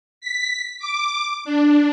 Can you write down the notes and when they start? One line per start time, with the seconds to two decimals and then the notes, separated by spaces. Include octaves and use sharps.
0.21 B6
0.79 D6
1.45 D4